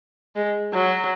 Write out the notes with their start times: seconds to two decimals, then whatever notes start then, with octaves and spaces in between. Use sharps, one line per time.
0.36 G#3
0.73 F#3